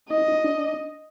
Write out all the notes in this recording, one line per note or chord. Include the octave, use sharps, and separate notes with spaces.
D#4 D#5
D#4
D#4
D4